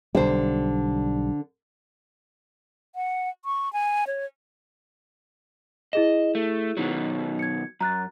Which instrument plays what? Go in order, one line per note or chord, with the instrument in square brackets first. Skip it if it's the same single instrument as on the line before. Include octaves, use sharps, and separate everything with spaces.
[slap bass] B1 G3 [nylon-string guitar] D3 C5
[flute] F#5
C#6
G#5
C#5
[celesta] E4 G#4 E7 [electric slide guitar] D#5
[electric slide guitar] A3
B2 D#3 F#3
[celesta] G#6 C#7
[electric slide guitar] F#2 [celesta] A#5 F#6 A6